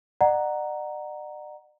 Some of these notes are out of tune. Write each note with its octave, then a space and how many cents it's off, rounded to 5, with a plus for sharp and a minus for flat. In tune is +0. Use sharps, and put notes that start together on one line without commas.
D5 +40 F#5 +0 A#5 +0